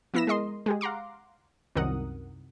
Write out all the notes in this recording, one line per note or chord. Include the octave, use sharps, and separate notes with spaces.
F3 B3 E4 A#6 B6 E7
G#3 A#4 D#5 C6
G#3 G4 G#4
F5 F#5 A#5 C6 D6
C2 F#2 D#3 A#4 F#5 D#6